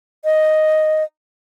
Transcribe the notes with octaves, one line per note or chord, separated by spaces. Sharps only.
D#5